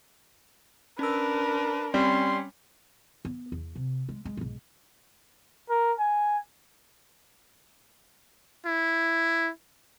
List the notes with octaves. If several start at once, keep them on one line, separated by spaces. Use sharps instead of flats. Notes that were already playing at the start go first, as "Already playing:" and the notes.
C#4 D4 A#4 B4 E6
G3 C4 C#4 C6
B3
E2
C3
G#3
G#3
B1 G#2
A#4
G#5
E4